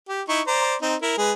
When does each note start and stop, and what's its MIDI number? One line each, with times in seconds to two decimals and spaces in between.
0.09 0.22 67
0.29 0.41 63
0.29 0.41 64
0.29 0.41 85
0.47 0.75 72
0.47 0.75 74
0.47 0.75 82
0.82 0.96 60
0.82 0.96 63
1.02 1.14 64
1.02 1.14 70
1.18 1.33 56
1.18 1.33 68
1.18 1.33 71